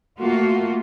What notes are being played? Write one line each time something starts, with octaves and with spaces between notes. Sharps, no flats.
A3 A#3 F4 F#4